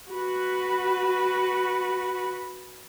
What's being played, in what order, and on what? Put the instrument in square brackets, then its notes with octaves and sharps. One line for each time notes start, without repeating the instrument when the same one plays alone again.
[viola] F#4 B4